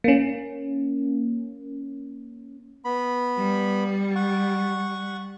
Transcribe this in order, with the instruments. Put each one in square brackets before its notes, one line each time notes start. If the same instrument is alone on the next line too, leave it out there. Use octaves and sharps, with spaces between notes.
[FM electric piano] A#3 C#4
[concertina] B3 B5
[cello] G3
[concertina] F#5 C#6